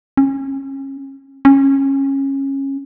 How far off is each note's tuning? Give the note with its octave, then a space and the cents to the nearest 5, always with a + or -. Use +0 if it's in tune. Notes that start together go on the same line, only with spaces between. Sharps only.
C#4 -30
C#4 -20